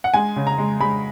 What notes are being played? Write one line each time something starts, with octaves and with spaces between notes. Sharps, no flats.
F#5
G#3 G#5
C#3
A#5
G#3
G#3 B5